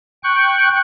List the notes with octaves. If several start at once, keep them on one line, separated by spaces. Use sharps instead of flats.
G5 C#6 F#6